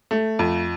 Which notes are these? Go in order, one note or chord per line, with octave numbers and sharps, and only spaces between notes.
A3
F2